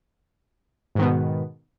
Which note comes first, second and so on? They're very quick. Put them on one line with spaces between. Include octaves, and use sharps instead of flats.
G#2 D#3 B3 B2